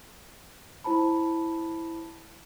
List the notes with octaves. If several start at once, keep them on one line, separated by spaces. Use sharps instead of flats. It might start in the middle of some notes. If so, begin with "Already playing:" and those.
E4 C5 A5 B5